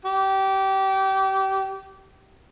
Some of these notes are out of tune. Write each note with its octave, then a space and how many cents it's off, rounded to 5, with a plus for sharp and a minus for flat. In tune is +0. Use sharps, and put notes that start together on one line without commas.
G4 -25